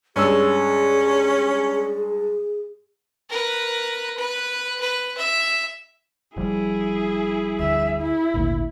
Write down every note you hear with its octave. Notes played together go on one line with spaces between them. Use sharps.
G2 G#3 C#4 G#4 E6
A#4 B4
B4
B4
E5
F1 F3 G3 E4 G#4
D2 E5
E4
G#1 D2 A#2